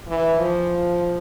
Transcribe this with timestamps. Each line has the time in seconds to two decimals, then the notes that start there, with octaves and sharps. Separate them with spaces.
0.08 E3
0.38 F3